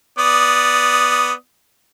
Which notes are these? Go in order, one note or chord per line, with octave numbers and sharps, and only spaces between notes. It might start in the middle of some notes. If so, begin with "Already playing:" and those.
B3 D5 D#6